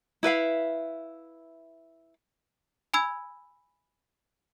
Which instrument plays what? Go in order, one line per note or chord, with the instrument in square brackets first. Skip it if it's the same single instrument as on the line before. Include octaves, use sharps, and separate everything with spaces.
[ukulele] E4 B4 E5 F5
[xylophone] G#5 B5 E6 G#6